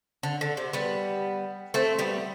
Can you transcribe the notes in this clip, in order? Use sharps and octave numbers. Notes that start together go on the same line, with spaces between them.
D3
D3
C3
G3 B3
A3 C4
G3 B3